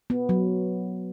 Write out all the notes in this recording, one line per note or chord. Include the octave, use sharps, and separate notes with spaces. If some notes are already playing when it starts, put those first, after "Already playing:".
B3
F#3